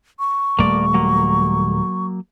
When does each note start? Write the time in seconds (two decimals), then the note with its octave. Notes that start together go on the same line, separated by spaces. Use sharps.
0.19 C#6
0.59 D#1 G3 A3 A#3 D5
0.94 F#3 A#3